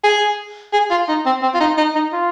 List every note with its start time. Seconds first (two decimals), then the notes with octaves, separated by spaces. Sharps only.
0.04 G#4
0.73 G#4
0.90 F4
1.08 D#4
1.25 C4
1.43 C4
1.54 F4
1.60 D#4
1.78 D#4
1.95 D#4
2.13 F4